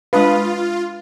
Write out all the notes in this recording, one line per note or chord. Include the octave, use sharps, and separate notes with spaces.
G#3 D4 F4 B4 F5 D#6